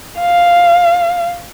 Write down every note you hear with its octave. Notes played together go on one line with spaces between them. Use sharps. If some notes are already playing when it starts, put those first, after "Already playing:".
F5